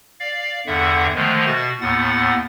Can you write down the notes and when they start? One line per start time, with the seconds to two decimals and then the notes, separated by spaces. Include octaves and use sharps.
0.20 D5 F5
0.67 E2 G2 D3 E5 F#5
1.15 D3 D#3 F3 G#3 A3
1.47 B2 F#4 A6
1.81 D#2 A2 B3 F#5 A6